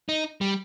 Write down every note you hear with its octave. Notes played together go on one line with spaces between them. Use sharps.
D#4
G3